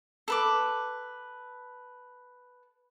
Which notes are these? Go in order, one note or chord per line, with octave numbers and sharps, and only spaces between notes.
A4 B4 D6